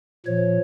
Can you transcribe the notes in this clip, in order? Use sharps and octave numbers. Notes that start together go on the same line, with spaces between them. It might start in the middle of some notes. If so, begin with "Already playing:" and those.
A#2 F3 C#5